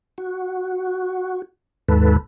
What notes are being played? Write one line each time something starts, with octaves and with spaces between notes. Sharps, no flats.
F#4
D#2 G#2 A4 B4